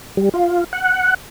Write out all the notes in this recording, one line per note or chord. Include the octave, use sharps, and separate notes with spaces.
G3
F4
F#5